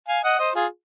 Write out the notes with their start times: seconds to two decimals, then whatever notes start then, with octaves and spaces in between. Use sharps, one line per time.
0.08 F5 G#5
0.24 D#5 F#5
0.39 C5 D#5
0.55 F4 G#4